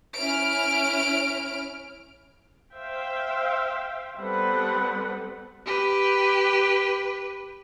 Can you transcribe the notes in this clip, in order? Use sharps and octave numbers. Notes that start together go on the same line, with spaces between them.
C#4 E4 F6 D7
C5 E5 F5 G5
G3 B3 C4 A4 B4 F#5
G4 B4